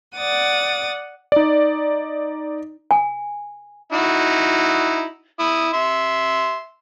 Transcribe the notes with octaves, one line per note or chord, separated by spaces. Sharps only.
D5 F#5 D#6 A6
D#4 D5
G#5
D#4 E4 F#4
E4 D#6
E5 C6